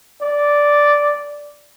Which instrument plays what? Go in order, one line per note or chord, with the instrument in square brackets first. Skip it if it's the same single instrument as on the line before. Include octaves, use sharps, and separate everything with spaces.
[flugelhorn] D5